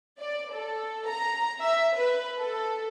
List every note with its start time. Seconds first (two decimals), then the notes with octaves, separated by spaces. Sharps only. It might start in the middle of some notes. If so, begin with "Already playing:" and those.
0.19 D5
0.52 A4
1.07 A#5
1.61 E5
1.96 B4
2.40 A4